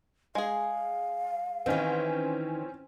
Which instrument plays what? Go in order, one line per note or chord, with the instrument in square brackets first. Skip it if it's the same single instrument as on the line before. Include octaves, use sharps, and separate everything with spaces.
[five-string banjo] G#3 G#4 [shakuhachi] F5
[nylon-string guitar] D#3 E3 [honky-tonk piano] C4 C#4